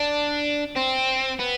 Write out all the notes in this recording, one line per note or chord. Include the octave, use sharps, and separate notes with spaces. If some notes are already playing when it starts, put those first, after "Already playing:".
Already playing: D4
C4
B3